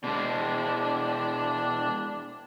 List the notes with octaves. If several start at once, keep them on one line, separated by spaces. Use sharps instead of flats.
B2 G#3 D4